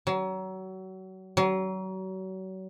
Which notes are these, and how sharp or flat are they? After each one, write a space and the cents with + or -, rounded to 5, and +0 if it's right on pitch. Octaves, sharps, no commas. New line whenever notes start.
F#3 +30
F#3 +35